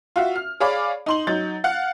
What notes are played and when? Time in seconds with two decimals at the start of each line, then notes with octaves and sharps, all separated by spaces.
0.16 F4 F#4 E5
0.36 F6
0.60 G#4 C#5 D5 F5 B5 D6
1.06 D#4 C6 F#7
1.27 F#3 D#4 G6 A6
1.64 F5 F#5 F#6